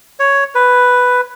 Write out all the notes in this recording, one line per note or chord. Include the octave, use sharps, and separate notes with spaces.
C#5
B4